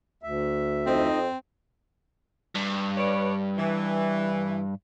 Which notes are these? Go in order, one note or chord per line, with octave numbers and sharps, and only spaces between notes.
D2 E5
F2 C4 D#4 D#5
G2
B4 C#5 D5
E3